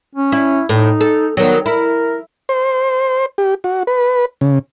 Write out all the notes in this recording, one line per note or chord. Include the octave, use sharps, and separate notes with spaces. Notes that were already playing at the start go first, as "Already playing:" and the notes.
C#4
E4
A2 D#4
A4
D#3 F#3 B3
E4 A#4
C5
G4
F#4
B4
C#3